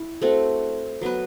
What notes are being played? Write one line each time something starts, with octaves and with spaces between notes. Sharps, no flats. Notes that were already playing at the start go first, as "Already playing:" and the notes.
Already playing: E4
A3 C4 F#4
F#3 B3 F#4 B4